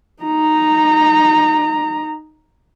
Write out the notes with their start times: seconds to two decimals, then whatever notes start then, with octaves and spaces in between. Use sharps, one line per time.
0.23 D#4 A#5